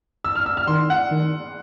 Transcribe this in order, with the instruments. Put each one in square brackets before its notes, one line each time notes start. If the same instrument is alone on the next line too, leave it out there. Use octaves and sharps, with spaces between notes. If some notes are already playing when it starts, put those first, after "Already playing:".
[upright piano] E6
F6
E6
F6
[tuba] D#3 [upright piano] C6
[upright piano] F#5
[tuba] D#3